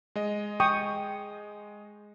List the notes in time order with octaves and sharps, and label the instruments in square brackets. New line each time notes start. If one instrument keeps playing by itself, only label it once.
[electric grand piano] G#3 D#5
[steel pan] G5 C#6 D#6